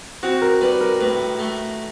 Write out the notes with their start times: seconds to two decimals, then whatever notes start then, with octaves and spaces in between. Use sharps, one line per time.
0.23 C4 F#4
0.42 A#4
0.61 G3 B4
0.81 A#4
1.00 A2 B4
1.39 A3